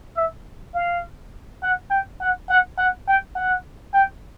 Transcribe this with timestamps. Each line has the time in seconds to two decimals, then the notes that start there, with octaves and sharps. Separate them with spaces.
0.17 E5
0.75 F5
1.63 F#5
1.91 G5
2.21 F#5
2.49 F#5
2.78 F#5
3.08 G5
3.36 F#5
3.94 G5